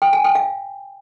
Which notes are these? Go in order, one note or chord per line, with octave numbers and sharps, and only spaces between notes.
G5
G#5
G5
F5